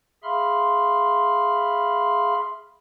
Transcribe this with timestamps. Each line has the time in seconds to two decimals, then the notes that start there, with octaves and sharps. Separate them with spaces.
0.24 G#4 E5 F5 B5 C6 F6